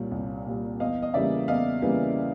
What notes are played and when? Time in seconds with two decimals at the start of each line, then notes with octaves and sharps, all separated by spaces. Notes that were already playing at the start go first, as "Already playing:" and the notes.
Already playing: C2 A#2 G3 C#5
0.12 C2
0.46 A#2 G3
0.80 E2 D#5 F5
1.02 D#5
1.14 C#3 E3 G3 A#3 D5 E5
1.48 E2 D#5 F5
1.82 C#3 E3 G3 A#3